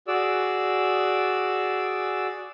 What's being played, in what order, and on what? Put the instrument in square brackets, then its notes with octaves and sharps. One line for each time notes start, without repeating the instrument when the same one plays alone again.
[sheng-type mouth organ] F#4 G#4 D5 E6